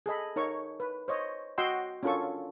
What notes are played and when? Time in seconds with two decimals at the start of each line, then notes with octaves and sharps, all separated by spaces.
0.06 G#4 A4 D#5 B5
0.36 D#4 A#4 C#5 C#6
0.80 B4
1.08 C5 C#5 D#5
1.58 F#4 D#5 F#5 G5 C6 E6
2.03 C#4 D4 F4 A4 A#4 C#6